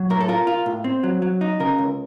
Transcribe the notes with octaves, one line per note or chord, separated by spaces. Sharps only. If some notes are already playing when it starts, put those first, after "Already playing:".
Already playing: F#3
A2 A#4
A4
F4 A#4
F4
A2
C4
F#3
F#3
D#4
C#3 A#4
C#2